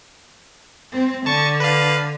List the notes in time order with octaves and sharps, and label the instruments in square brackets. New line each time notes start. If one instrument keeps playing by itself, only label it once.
[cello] C4
[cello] D3 [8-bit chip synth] A5 C#6
[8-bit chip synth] B4 F5